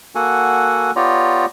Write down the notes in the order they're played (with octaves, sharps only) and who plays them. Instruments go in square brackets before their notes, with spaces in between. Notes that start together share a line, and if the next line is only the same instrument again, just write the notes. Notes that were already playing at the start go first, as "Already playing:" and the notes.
[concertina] A#3 F#4 A4 F#5 G#5
B3 F4 G4 C#5 D5 A#5